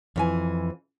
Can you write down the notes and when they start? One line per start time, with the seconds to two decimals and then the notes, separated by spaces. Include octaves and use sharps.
0.16 F2 E3 G#5